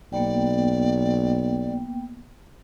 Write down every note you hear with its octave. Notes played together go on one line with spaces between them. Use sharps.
B1 A#3 B3 D5 G5